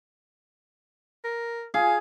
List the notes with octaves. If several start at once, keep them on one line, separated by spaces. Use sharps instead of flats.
A#4
G#4 F5